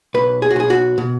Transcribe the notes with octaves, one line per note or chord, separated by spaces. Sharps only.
B1 B4
G#4
F#4
B1 G#4
F#4
B2